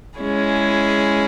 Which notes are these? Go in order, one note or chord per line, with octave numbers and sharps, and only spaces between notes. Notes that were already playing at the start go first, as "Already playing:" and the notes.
G#3 C#4 E4 G#4